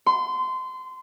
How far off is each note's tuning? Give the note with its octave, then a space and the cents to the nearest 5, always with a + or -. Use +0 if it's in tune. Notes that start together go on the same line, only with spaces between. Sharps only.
C6 -25